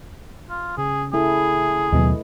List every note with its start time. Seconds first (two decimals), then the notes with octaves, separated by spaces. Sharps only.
0.50 F4
0.78 C#3 G#4
1.13 A3 E4 G#4 A4
1.92 D#2 B2 F#3 A3 B4 D#5